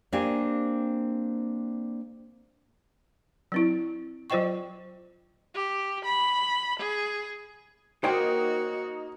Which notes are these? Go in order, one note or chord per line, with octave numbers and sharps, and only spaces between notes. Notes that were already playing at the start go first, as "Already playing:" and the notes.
A#3 C4 D4 G4 G#5
F#3 C4 E4
F#3 F4 C5 D#5 G5 C#6
G4
B5
G#4
A#3 D#4 F#4 C5 C#5 G5